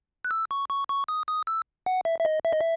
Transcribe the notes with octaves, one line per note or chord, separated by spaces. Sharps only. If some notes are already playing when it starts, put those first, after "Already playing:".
F#6
E6
C#6
C#6
C#6
D#6
D#6
E6
F#5
E5
E5
D#5
E5
D#5
E5